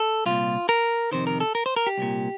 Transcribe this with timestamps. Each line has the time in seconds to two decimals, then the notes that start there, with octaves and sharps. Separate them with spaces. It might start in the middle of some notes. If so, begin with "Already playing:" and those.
Already playing: A4
0.26 C2 A#2 F4
0.69 A#4
1.12 F2 C3 D#3 C5
1.27 A#4
1.40 A4
1.55 A#4
1.66 C5
1.76 A#4
1.87 G4
1.98 C2 A#2